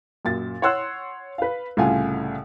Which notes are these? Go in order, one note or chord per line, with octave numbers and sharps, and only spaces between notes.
F#2 A#2 A6
C#5 F#5 C6 E6 F#6
B4 F5
C2 A2 C#3 F4 F#5 G#5